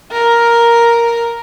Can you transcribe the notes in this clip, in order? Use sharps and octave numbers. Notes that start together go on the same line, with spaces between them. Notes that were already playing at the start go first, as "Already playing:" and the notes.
A#4